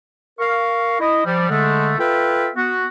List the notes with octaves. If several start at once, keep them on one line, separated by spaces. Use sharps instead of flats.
A#4 F5 C#6
E4 D#5
F3 G3
D3 G#3 A3
F4 A4 B4 E5 F5 G5
B3 F#4